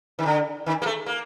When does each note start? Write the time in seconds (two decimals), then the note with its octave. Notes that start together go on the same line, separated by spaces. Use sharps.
0.19 D#3
0.26 D3
0.66 D#3
0.82 A#3
0.86 A3
1.06 A#3